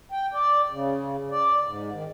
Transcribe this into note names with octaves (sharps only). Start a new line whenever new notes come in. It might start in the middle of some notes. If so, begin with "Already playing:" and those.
G5
D5
C#3
D5
G#2
D#3